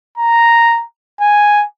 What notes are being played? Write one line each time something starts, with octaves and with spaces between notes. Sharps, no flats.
A#5
G#5